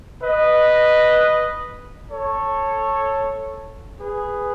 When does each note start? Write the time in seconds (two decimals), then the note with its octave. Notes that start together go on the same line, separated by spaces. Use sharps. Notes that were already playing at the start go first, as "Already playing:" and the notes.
0.23 B4 D#5
2.12 A4 C#5
4.01 G#4 B4